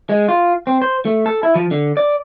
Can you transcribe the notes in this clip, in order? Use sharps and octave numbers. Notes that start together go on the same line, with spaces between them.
G#3
F4
C4
C5
A3
A4
E4
F3
D3
D5